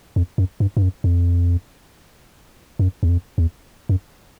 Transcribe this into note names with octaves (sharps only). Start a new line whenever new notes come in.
F2
F#2
G2
G2
F#2
F2
F#2
E2
F2
E2
F#2